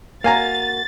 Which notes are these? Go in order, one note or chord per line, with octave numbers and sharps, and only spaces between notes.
A#3 F#4 F5 G#5 A#5 A6